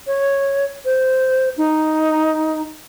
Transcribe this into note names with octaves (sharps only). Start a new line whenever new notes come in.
C#5
C5
D#4